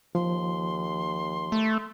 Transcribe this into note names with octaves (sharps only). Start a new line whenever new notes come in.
D#2 F3 C6
A3